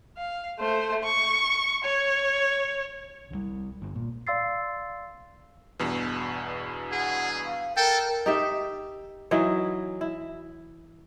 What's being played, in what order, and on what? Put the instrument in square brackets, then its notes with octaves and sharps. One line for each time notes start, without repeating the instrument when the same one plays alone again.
[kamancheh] F5
A3 C5
C#6
C#5
[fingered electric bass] C2 F3 G3
G1
A#2
[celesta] D5 F5 C6 E6 A6 C7
[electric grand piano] E2 G2 B2
[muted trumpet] G#4 [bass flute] F#5
[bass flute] F5
[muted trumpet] A4 [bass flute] A#4 [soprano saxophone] G5
[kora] D#4 G4 E5
E3 F#3 D#4 E4
E4